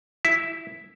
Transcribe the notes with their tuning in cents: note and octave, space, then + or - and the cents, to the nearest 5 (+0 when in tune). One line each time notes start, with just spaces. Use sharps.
E4 +0 E5 +0